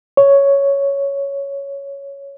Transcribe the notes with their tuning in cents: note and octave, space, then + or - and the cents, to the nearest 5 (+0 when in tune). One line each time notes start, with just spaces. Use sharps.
C#5 +5